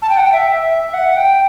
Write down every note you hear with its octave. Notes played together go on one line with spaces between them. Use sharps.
A5
G5
F#5
G5
E5
E5
F#5
G5